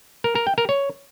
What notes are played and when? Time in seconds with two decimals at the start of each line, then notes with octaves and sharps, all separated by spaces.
0.24 A#4
0.35 A#4
0.47 G5
0.58 A#4
0.69 C#5